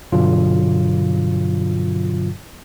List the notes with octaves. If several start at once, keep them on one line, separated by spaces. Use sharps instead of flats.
G2 B2 D3 F#3 F4